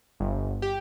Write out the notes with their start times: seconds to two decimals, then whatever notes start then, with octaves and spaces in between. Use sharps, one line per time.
0.20 G1
0.62 G4